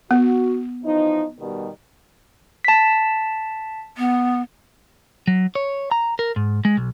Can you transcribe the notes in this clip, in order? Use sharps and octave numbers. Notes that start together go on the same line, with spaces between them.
B3 F#4
E3 F3 D#4
B2 D#3 G3
A5 B6
B3
F#3
C#5
A#5
A#4
G#2
G#3
B1